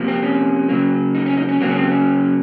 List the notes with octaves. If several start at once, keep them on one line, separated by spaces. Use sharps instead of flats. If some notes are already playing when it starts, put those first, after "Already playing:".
Already playing: C3 F3 A#3
C4
C#4
C#3 F#3 A#3
D#4
C#4
D#4
C#4
C#3 F#3 A#3 C4
C#4
C4
C#4